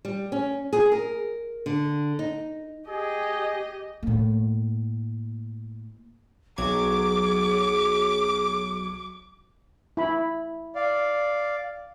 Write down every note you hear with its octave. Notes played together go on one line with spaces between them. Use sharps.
G3
C#4
G#4
A#4
D3
D#4
G4 G#4 D#5
A2 A#3
B1 F#3 G#4 D6 G#6
E4 B5
D5 F5